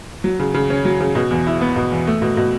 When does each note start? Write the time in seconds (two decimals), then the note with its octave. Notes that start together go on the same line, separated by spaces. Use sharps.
0.24 F#3
0.39 C#3
0.54 C#3
0.70 C#4
0.85 F#3
1.00 C#3
1.15 B2
1.31 E2
1.47 E4
1.61 B3
1.76 B2
1.92 E2
2.07 A3
2.22 B2
2.37 B2